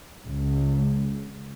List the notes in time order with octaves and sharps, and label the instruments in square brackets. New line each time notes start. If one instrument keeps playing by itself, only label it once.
[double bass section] C#2